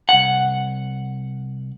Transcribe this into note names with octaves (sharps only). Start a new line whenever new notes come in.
C2 F#5